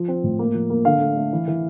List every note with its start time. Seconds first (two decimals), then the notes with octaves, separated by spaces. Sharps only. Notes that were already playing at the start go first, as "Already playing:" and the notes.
Already playing: F3
0.08 C4
0.24 A2
0.39 A#3
0.54 F3
0.70 A#3
0.85 D3 F5
1.01 A3
1.17 A3
1.33 E3
1.48 E3